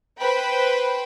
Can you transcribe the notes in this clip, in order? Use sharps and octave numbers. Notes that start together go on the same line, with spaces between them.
B4 C5 G5 B5